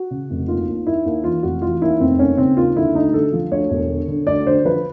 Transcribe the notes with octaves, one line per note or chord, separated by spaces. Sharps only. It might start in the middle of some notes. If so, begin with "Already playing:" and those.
Already playing: F#4
C#3
F1
D#2 F4
D#2
D#2 E4
D#2
E3 F4
F1 F#4
E3 F4
D#2 E4
F1 C4
D#2 C#4
C#3 C4
D#2 F4
D3 E4
D2 D#4
D3 A4
F3
D2 C#5
E1
D3
D3
D2 D5
D3 C5
F3 B4